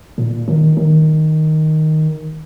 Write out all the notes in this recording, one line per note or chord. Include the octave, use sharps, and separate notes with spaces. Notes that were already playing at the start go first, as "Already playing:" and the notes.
A#2
D#3
D#3